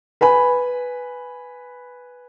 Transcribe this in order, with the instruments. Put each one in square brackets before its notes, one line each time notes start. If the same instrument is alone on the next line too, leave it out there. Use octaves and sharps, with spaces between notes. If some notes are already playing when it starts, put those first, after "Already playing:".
[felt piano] B4 G#5 B5